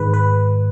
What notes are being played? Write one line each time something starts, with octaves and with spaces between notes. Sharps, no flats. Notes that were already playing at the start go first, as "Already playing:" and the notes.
Already playing: G#2 D#3 G#3 B4
B4